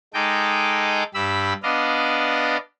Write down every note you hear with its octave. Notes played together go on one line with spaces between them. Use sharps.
G#3 D#4 A4 D#5 G5 D6
G2 G4 B5 E6
B3 D4 D5 D#5 F5